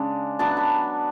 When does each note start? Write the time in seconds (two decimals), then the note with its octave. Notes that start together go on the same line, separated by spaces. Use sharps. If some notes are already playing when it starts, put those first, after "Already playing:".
Already playing: C#3 G#3 D4
0.39 F#3 B3 D4 A5
0.57 B5